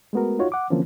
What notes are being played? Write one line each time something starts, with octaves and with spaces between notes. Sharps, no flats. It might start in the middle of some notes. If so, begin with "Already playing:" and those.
G#3 A3 B3 F#4 A#4
D#4 F4 F#4 C#5
F#5 D6
D3 E3 F3 A#3 C4 C#4